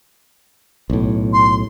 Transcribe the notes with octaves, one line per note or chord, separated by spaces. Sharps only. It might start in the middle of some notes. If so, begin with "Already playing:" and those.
B1 A2
C6